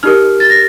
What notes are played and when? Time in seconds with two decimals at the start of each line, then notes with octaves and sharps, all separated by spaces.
0.03 D#4 G4 A#4 F6
0.40 A6
0.50 A#6